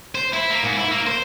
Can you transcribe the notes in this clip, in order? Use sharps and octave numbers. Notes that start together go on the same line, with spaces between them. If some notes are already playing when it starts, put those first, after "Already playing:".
C5
E4
A#3
G#2
E4
A#3
C5